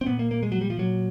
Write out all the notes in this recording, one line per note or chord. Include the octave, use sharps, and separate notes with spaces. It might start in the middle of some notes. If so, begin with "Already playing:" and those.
C4
A#2 B3
A#3
A#3
G#3
F#3
G3
F3
A#2 F#3